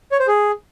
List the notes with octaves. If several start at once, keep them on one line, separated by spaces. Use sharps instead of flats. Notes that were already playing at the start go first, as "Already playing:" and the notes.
C#5
C5
G#4